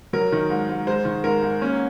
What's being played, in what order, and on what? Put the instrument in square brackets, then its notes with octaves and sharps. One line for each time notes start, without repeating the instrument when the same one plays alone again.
[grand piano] F#3 A#4
D#3
G#2
G#2
G#3 C5
D#3
G#2 A#4
G#2
A#3 C#4